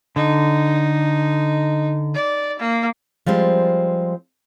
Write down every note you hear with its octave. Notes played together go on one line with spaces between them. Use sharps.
D3 D#4
D5
A#3
F3 G3 G#3 C4